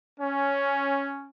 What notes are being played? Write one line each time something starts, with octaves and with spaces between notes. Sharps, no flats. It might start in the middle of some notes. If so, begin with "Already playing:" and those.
C#4